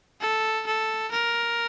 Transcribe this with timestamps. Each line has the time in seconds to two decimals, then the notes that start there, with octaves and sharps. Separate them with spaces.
0.21 A4
0.66 A4
1.12 A#4